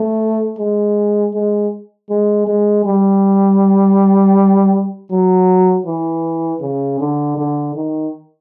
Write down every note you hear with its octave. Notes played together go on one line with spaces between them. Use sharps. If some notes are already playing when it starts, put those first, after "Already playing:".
Already playing: A3
G#3
G#3
G#3
G#3
G3
F#3
E3
C#3
D3
D3
D#3